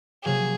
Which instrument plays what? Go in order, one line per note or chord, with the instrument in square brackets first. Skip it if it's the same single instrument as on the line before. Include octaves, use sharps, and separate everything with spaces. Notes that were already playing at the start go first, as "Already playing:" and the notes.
[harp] C3 F#3 A#3 [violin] G#4